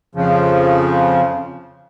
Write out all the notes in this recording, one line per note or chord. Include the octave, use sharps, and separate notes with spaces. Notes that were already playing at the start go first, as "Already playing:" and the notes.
F2 C#3 F3